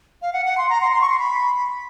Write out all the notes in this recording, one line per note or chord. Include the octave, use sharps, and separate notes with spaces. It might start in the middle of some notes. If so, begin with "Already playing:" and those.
F5
F#5
F#5
C6
A#5
C6
C6
C#6
C6
B5